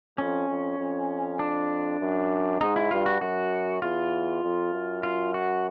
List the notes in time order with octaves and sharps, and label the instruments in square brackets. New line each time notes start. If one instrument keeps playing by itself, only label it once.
[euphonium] F2 [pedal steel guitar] C#4
[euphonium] F2
F2
[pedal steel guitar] D4
[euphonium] F#2
[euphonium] G#2 [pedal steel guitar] D#4
[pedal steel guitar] E4
[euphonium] G2 [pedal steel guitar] F4
[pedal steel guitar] F#4
[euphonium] F#2 [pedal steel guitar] F#4
[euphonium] E2 [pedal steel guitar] F4
[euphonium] F2
F#2
[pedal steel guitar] F4
F#4